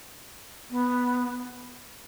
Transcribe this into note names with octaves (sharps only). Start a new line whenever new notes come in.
B3